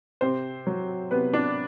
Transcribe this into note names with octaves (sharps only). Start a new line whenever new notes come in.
C3 C4 C5
F#3
C3 B3 B4
D4 D5